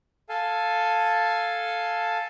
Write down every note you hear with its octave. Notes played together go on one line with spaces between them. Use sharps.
A4 F5 G#5 A5